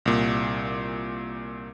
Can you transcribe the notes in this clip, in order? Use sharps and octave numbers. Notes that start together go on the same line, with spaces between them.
C2 A#2